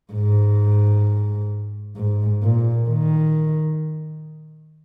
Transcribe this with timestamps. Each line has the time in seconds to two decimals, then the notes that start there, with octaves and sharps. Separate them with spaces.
0.13 G#2
1.97 G#2
2.43 A#2
2.89 D#3